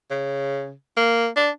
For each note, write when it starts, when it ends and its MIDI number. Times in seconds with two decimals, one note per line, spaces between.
0.11 0.73 49
0.97 1.27 58
1.36 1.50 62